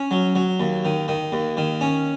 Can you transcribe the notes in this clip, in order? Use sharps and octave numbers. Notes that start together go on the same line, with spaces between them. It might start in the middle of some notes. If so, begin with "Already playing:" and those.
Already playing: C#4
F#3
F#3
D#2
D#3
D#3
D#2
D#3
C#4